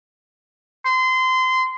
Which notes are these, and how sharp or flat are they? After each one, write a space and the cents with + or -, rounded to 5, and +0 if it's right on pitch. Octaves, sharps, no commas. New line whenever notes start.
C6 -25